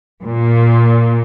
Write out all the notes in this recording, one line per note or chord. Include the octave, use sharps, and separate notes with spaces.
A#2